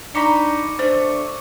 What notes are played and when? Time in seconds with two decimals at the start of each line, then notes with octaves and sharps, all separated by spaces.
0.15 D4 D#4 B5 C#6 D6 C#7
0.79 A3 D4 C5